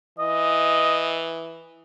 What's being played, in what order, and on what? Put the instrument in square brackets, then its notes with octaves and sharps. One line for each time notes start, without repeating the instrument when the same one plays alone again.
[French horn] E3 [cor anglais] D#5